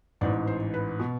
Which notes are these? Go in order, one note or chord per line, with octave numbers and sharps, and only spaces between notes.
A1 G#2 E3 D5
C5
B4
B2